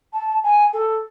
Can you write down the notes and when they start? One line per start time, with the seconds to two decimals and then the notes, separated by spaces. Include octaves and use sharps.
0.13 A5
0.43 G#5
0.73 A4